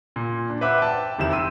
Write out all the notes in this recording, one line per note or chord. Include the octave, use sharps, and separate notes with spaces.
A#2
D4
B4 C5 E5 F#5 D6
G5 A5
F1 D#3 E4 G4 C5 E7
C6 E6 D#7